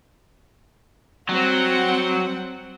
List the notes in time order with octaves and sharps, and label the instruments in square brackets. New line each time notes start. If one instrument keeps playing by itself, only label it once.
[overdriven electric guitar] F#3 [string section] G3 C4 F#5